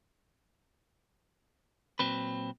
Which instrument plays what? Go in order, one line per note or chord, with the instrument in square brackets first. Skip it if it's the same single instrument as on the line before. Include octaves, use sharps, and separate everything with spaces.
[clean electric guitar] A#2 F#3 C4 B4